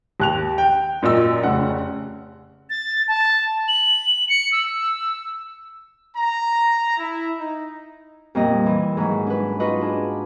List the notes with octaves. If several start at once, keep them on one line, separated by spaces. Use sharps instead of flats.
D#2 F#6 F7
G5
F#2 A#2 D#5 E6
F1 C#3 F#5
A6
A5
F#7
C#7
E6
A#5
E4
D#4
F2 A#2 G3 D#5
E3
G#2 D#3 F#3
C#4 D4 B4
D#4 F4 F#4 B4 D#5
D4 G#4